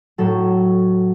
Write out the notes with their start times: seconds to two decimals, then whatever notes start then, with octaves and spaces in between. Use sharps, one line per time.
0.18 A2 F#3 A4